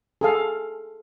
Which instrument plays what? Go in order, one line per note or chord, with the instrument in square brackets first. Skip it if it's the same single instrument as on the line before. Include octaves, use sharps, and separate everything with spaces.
[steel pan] G#4 A4 F5